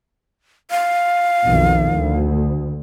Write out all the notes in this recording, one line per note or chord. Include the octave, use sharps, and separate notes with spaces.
F5
B1 F2 D#3
D2